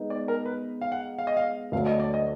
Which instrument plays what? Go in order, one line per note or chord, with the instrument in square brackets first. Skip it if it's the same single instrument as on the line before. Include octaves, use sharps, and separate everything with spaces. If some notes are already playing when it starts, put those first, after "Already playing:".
Already playing: [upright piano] G#3 B3 D#4
[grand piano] D5
A#4
B4
F5
F#5
F5
D#5
F5
[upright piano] D2 D3 F#3 D4 [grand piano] F5
[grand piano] D#5
D5
D#5